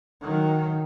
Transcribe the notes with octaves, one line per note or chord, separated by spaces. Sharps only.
D#3 F#3